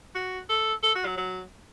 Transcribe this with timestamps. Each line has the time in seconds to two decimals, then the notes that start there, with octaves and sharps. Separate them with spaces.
0.15 F#4
0.49 A4
0.83 A4
0.95 F#4
1.06 F#3
1.17 F#3